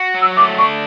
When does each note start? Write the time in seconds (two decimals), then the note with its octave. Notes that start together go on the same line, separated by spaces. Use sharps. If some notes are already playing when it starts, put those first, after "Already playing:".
Already playing: F#4
0.14 F#3
0.22 E6
0.36 A3 D6
0.58 D4 C#6